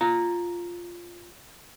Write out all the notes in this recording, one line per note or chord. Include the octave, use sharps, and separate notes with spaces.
F4 A#5